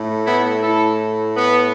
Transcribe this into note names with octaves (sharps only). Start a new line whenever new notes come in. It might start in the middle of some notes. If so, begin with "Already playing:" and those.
Already playing: A2 A3
B3 E4
E4 A4
B3